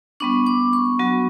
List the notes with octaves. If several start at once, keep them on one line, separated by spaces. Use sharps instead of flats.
G3 B3 D4 C#6
D6
C#6
F#3 B3 F#4